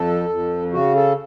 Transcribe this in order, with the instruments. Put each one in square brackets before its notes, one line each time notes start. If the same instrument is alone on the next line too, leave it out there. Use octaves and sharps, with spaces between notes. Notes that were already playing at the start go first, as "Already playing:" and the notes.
Already playing: [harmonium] F2 A4
F2
C#3 F#4
A4